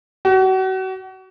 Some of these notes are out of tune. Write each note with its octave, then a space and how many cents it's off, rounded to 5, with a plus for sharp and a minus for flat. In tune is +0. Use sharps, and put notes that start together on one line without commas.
F#4 +35